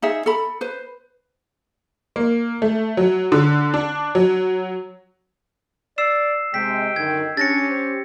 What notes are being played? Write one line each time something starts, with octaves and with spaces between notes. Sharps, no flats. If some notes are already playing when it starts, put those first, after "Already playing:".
D#4 G#4 E5
A4 B5
B4 C5
A#3
A3
F#3
D3
D4
F#3
D5 E6 C7 E7
C3 G#3 G5 B6
F#2 D3 D#3 G#6
C#4 D4 G4 A6 A#6 C#7
C5